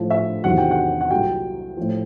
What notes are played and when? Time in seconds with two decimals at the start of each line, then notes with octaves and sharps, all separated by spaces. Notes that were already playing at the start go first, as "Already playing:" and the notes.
Already playing: A2 F3
0.11 E5
0.44 E2 C3 D#3 F#3 F#5
0.58 G5
0.71 F#5
1.01 F#5
1.11 C2 A#2 F#3 G5
1.77 A2 F3